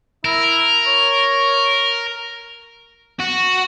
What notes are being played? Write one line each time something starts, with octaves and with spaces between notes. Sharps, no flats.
E4 A#4
C#5
F#4